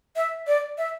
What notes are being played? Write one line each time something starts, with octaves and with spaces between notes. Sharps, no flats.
E5
D5
E5